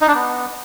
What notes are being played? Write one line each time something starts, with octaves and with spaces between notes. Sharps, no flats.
D#4
D4
B3